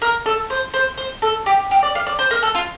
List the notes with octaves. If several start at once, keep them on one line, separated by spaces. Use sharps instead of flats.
A#4
A4
C5
C5
C5
A4
G4
G4
D5
F5
D5
C5
A#4
A4
F4